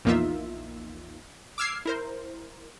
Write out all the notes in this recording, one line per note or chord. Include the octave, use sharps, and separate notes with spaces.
A#1 E2 A#3 D#4 F4 E5
D6 E6 F6 G#6 C7
E4 A#4 C5